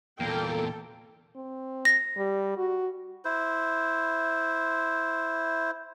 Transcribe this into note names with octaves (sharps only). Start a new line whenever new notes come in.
E2 A#2 A#3 A4 G5
C4
A#6
G3
F#4
E4 C5